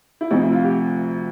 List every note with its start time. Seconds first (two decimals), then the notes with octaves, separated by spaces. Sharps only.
0.21 E4
0.31 D2 C3 F3 D#4
0.42 E4
0.52 F4
0.64 G4